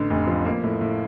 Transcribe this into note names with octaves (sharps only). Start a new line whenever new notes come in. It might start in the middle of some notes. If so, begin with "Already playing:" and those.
Already playing: A1 D3
F1
F3
A#3
A2
A2